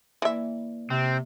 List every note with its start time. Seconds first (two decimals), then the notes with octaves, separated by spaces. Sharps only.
0.22 E3 A#3 D5 E5
0.90 C3 C4